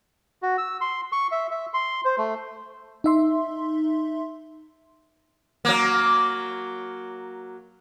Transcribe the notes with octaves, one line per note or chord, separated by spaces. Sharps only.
F#4
E6
C6
C#6
E5
E5
C6
C5
A3
D#4 E5 C6
F#3 A#3